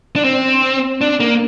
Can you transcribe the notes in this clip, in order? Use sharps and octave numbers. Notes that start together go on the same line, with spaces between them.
D4
C4
D4
A#3